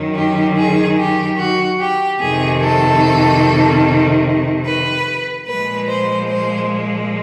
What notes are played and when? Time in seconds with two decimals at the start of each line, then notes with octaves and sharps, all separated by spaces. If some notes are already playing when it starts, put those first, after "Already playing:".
Already playing: F#2 D#3 F#3
0.16 G4
0.57 G#4
0.98 G4
1.39 F#4
1.79 G4
2.20 F2 C3 D#3 G#4
2.61 A4
4.66 B4
5.48 A#2 F3 G#3 B4
5.89 C5
6.30 C5